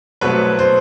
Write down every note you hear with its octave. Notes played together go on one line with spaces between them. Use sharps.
C2 B2 F#3 A3 C4 B4 C#5
C5